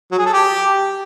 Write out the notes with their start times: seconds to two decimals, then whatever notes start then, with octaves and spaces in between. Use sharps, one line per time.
0.11 F#3
0.18 G#4
0.26 A4
0.33 G4